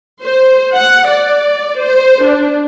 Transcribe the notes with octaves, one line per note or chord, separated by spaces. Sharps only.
C5
F#5
D5
C5
D4